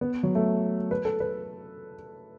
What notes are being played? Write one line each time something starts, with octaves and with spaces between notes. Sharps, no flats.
B3
F#3
A3
B4
A4
B4